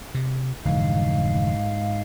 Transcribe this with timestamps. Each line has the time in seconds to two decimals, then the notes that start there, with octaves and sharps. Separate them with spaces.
0.15 C3
0.65 F1 G#2 D3 E3 G#3 F5